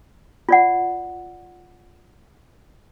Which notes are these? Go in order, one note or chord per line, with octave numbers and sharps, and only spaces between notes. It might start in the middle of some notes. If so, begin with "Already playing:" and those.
F4 D5 F#5